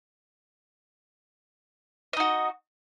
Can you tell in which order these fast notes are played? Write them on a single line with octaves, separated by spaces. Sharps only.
D#5 D#4 F#4